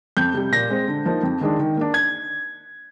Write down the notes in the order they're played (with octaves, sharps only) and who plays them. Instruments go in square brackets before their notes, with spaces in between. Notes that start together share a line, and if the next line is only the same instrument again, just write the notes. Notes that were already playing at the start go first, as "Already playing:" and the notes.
[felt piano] F2 [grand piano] G6
[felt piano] C3 G3
[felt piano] A#2 [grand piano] A#6
[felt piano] G#3 C4
D3
F3 A#3 D#4
F2
D#3 G#3 D4
D#3
A#3 D4
[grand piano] G#6